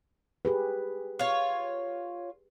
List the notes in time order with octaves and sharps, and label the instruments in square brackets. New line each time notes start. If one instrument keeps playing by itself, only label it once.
[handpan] G4 G#4 B4
[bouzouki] F4 C#5